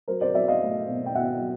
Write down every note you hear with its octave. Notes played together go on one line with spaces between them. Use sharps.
F#3 A#4 C5
C5 D5
F#3 D5 E5
D#5 F5
A3
B2
G5
B2 E5 F#5
F#3